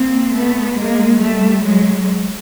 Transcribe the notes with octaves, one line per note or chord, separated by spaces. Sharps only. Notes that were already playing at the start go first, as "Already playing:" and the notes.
Already playing: A#3 C4
A3 B3
G#3 A#3
G3 A3
F#3 G#3